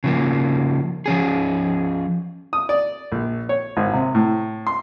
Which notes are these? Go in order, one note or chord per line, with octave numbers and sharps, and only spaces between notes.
C#3 F3 A#3
F3 C#4 G#4
D#6
D5
A#1
C#5
G#1
C3
A2
C6